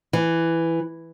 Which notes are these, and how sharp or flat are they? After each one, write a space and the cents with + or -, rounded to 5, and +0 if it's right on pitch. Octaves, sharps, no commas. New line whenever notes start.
E3 +5